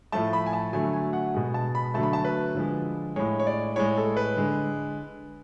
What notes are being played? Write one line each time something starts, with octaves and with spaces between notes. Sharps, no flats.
A2 F3 A3 A5
B5
G#5
A5
D3 F#3 A3 G#5
G#5
F#5
B2 G#3
A5
B5
D3 F#3 A3 A5
B5
A5
B4
D3 F3 G#3
A2 G#3 C#5
C#5
D5
A2 G#3 C#5
A4
B4
D3 G#3